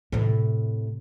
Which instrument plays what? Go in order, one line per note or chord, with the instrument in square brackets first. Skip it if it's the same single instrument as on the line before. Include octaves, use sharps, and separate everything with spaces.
[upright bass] A2 C3